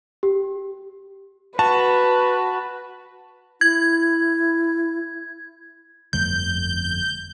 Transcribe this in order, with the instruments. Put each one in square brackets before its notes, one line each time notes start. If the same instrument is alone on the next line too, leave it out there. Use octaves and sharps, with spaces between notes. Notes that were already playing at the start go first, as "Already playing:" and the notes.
[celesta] G4
[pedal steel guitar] F#4 [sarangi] B4 [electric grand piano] A5
[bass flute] E4 [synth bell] G#6
[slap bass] G1 F2 A3 [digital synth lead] G6